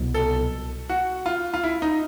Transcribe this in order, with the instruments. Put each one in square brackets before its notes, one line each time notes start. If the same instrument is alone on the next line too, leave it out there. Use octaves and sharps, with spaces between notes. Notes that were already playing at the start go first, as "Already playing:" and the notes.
Already playing: [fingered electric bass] C2 B2 F#3
[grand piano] A4
F#4
F4
F4
E4
D#4